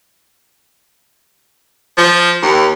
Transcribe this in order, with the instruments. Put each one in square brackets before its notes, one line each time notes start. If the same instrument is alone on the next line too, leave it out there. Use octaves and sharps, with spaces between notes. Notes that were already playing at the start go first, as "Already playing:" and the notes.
[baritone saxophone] F3
D#2